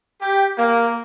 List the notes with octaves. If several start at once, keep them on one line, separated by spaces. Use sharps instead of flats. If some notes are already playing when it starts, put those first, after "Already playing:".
G4
A#3